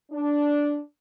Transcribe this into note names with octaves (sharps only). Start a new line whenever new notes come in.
D4